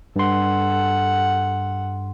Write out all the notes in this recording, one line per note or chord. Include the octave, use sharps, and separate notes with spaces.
G2 A4 F#5 C6